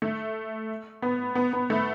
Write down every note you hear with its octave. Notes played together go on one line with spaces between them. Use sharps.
A3
B3
B3
B3
A3